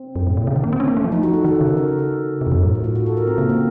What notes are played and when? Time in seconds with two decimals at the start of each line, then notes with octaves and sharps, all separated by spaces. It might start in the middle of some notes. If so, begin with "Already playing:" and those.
Already playing: C4
0.16 F#2
0.27 A2
0.37 A#2
0.47 C#3
0.56 D#3
0.64 A#3
0.73 C4
0.80 C#4
0.88 A#3
0.97 A3
1.04 F3
1.12 D#4
1.23 F#4
1.34 A4
1.44 D#3 A4
1.55 A4
1.61 C#3
1.67 A#4
1.77 A#4
1.88 A4
1.99 A4
2.41 C3
2.47 F2
2.52 F#2
2.63 A2
2.74 F#4
2.84 F4
2.95 F#4
3.06 A4
3.17 A#4
3.27 C4
3.38 C#3 A#3
3.49 A#3